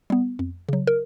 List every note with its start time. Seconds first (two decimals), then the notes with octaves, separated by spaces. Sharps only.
0.10 G3 B3
0.39 F2
0.69 C#3 F#3
0.87 A#4